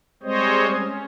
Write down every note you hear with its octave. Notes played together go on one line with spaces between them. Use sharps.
G3 G#3 C4 C5 C#5 D#5
C#4